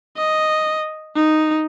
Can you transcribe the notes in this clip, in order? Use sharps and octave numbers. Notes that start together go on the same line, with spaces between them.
D#5
D#4